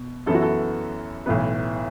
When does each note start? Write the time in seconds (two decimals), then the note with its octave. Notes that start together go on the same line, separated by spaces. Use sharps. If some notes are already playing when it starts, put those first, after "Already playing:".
Already playing: B2
0.26 F#2 E3 B3 A4
0.34 F#4
0.42 A4
1.26 B1 A2 E3 B3 B4